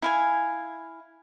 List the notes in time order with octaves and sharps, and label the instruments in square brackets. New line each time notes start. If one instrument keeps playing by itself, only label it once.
[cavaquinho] E4 F5 G#5